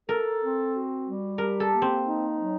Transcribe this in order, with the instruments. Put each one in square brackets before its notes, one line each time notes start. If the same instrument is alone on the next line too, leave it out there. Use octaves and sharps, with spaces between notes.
[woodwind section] A4 [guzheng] A#4
[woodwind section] C4
F#4
G3
[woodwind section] G4 [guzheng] A#4
[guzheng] A4
[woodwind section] A#3
[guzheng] C4
[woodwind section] D#4
F#3